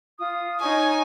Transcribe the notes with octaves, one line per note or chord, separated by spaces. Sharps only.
F4 D#6
D#4 C#5 G#5 C#6